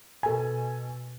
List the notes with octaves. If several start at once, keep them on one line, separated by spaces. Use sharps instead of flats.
B2 A4 G#5